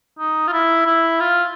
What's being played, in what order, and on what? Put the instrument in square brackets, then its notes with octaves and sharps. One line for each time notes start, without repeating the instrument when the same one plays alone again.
[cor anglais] D#4
F4
E4
E4
F4